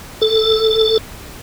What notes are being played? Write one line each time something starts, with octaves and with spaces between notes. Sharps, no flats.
A4